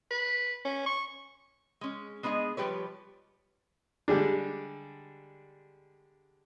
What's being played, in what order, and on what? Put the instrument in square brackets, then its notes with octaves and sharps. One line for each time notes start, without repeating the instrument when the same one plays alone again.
[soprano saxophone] B4
C#4
C#6
[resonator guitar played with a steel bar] G#3 C#4
G#3 B3 D4 G#4 D#5
F3 G3 G4 B4 C#5
[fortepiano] D3 G3 G#3 D4